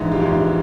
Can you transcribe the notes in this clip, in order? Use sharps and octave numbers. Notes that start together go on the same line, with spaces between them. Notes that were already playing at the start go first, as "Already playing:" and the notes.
Already playing: A#1 G#2 E3
F4 G4
A#1 G#2 E3